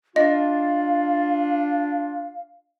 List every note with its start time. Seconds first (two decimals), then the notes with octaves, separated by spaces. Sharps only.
0.16 D4 F4 D#5 F5